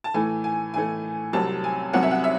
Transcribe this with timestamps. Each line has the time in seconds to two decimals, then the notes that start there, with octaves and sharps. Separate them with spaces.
0.04 A5
0.14 A2 E3 A3 G#5
0.44 G#5
0.74 A2 E3 A3 G#5
1.33 C2 C3 F#3 A5
1.64 G#5
1.93 C2 C3 F#3 F#5
2.03 E5
2.11 F#5
2.24 E5